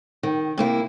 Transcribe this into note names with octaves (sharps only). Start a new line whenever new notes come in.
D#3
C3 A#3 E4